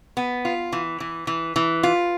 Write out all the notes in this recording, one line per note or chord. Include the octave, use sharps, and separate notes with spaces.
B3
F4
E3
E3
E3
E3
F4